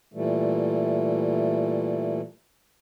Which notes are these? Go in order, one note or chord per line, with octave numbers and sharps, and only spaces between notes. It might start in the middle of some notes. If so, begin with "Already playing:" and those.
A#2 E3 G3 A3